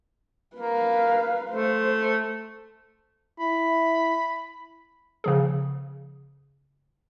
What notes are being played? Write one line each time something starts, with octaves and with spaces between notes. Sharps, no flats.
A#3 B4 F5
A3 C5
E4 B5
C#3 F3 G#4